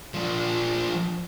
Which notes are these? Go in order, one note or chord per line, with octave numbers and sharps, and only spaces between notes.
F3 D4